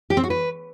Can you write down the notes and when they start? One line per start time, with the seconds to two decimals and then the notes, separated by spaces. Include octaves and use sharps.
0.10 G4
0.17 C4
0.24 F#4
0.30 B4